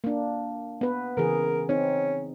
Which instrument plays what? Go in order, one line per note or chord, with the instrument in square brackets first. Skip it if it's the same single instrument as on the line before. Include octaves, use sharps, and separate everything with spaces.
[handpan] A#3 D4
B3 B4
[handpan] C#3 E3 G#4 [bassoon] A#4
[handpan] C4 D#4 [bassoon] C#4